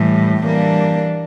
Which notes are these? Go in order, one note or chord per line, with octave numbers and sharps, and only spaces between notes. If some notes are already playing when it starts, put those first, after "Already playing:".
Already playing: A2 E3 G3
E3 G3 A#3 D4